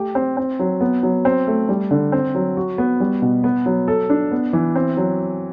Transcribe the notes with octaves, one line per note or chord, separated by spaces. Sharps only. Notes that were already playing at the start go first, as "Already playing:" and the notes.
Already playing: A3 G4
C4
C4
F#3
B3
F#3
C4
A3
G3
D3
C4
F#3
F#4
B3
G3
B2
B3
F#3
A4
D4
B3
E3
C4
F#3